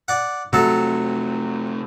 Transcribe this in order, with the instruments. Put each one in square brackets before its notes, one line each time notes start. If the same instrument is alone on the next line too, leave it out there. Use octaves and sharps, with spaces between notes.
[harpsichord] D5 F#5
[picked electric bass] C3 A3 [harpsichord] F#3 A4